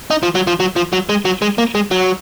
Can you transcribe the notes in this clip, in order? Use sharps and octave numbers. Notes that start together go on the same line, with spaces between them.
D#4
F3
F#3
F3
F#3
F3
F#3
G#3
F#3
G#3
A#3
G#3
F#3